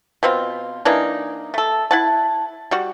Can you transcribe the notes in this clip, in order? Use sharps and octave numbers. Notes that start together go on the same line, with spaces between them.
B2 C4 F4
E3 A#3 D4 D#4
A3 A4
E4 F#5 A5
G3 F#4